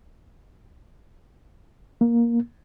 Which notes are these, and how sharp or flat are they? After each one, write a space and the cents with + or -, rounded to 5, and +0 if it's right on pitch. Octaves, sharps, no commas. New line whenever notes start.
A#3 +10